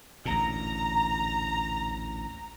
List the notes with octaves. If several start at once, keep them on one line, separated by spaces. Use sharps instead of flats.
A1 D2 A#2 A#5